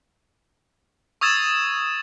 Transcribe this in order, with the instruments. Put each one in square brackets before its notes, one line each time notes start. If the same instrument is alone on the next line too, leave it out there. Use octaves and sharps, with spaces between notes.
[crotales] C#6 D#6 E6 G#6 A6 E7